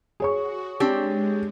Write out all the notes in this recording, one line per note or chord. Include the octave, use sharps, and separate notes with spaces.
F#4 G#4 C#5 C#6
G#3 C4 D4 G4